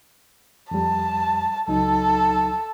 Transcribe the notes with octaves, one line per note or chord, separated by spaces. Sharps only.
F2 G3 A5
C#2 F#3 D#4 A4